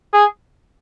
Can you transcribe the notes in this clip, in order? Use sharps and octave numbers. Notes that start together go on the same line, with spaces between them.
G#4